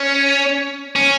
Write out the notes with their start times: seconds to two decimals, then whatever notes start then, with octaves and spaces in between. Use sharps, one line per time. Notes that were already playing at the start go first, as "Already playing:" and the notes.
Already playing: C#4
0.96 C#4